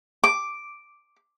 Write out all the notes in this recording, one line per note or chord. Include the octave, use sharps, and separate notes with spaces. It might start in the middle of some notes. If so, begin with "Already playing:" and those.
D6